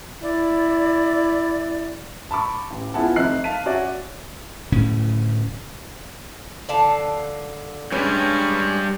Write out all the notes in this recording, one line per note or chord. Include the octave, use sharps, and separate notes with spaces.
E4 D5
A5 B5 C#6 D6
A1
B3 E4 F4 G#4 F#5 A5
F1 F2 D#4 E5 F#6 C7
F5 A5 B6 D#7
C#4 F#4 C#5 D5 E5
D1 A2 C#3 C#4
D3 F5 A5
G2 G3 G#3 C#4 B4